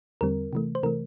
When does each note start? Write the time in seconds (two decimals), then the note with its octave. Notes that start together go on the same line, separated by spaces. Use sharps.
0.21 E2 D3 G3 C4 A#4
0.53 C3 E3 A3
0.75 C5
0.83 C3 E3 A3 A#4